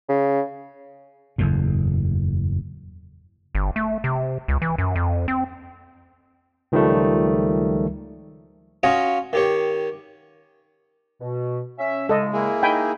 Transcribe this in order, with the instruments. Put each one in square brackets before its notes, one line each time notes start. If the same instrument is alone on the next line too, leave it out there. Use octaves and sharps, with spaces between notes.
[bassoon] C#3
[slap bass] F#1 E2 A2
[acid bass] G1
A3
C3
C#2
E3
F#2
F2
C4
[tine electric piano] C#2 D#3 F3 G3 A3
[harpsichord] C#4 F4 F#4 C#5 D#5
D#3 G4 C#5
[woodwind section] B2
C#4 E5
[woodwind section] A2 C#3 G#3 [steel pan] A4 D#5
[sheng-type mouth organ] A#3 E4 G#4
[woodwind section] D#4 [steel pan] G5 G#5 B5